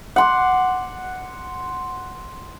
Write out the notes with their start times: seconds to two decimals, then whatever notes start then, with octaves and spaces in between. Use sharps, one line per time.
0.16 F#5 C6 D6